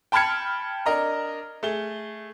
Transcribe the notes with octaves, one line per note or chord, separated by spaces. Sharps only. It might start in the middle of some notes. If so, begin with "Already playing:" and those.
G5 A5 B5 F6 G#6 C#7
D4 A#4 D#5 A#5
A3 G#4 G7